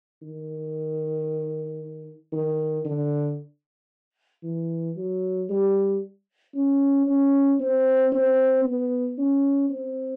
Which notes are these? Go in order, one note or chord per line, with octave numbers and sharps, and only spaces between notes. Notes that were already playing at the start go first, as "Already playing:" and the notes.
D#3
D#3
D3
E3
F#3
G3
C#4
C#4
C4
C4
B3
C#4
C4